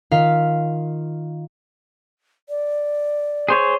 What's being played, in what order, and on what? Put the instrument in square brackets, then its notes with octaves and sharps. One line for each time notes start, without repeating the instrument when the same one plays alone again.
[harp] D#3 F4 F5 B6
[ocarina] D5
[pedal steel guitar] G#4 C5 C#5